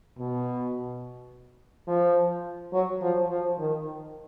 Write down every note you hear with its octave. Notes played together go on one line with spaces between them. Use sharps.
B2
F3
F#3
F3
F3
D#3